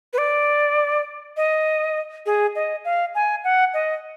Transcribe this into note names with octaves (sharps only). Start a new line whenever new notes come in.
B4
D5
D#5
G#4
D#5
F5
G#5
F#5
D#5